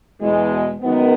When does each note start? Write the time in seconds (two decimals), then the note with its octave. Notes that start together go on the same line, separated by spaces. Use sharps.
0.20 E2 B2 G#3
0.81 F#2 D#3 G#3 B3